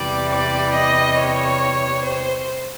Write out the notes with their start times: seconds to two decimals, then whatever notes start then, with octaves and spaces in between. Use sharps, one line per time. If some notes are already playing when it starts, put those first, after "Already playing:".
Already playing: E2 C3 E3 G3 D5
0.32 D5
0.74 D#5
1.17 C#5
2.03 C5